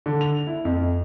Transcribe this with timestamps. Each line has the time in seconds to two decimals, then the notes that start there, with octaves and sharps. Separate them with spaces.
0.06 D3
0.21 F7
0.47 E4
0.65 F2